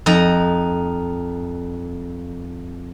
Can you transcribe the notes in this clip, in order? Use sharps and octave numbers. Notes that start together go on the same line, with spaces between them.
F2 D#4 A#5